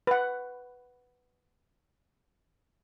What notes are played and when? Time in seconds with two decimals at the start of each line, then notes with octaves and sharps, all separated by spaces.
0.07 B4 F#5